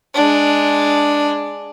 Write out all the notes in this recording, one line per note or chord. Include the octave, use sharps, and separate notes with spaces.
G#3 D4